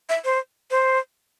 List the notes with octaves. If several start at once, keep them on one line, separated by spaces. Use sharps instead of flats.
E5
C5
C5